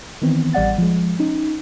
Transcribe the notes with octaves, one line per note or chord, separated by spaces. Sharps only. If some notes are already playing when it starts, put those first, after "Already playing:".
D#3 E3 B3 C4
A1 G3 D5 F#5 A6
F3 G#3
C#4 D#4